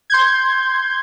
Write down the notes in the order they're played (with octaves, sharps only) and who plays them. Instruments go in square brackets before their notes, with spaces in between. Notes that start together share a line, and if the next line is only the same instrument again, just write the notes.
[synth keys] C6 G6 G#6